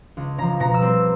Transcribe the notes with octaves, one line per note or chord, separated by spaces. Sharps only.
C#2
C#3 F3 A#5
B2 A#5
E6
G3 C4